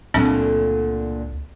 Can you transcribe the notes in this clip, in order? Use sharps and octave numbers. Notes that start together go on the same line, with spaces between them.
C#2 A#2 D3 F#3 A3 C4 D4